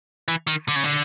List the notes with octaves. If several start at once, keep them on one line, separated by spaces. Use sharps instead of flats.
E3
D#3
D3
C#3
D3